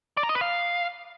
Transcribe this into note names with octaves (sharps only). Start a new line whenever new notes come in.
D5
A#5
D#5
B4
F5